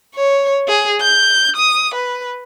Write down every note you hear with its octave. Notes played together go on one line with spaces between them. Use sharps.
C#5
G#4
G6
D#6
B4